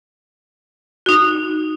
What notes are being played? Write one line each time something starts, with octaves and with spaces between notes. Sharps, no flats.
D#4 F#4